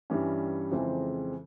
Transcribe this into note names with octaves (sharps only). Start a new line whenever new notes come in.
G2 E3 G3 C#4
F2 C#3 E3 G#3 C4